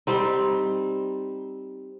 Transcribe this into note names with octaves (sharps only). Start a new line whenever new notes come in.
G3 C4 D#4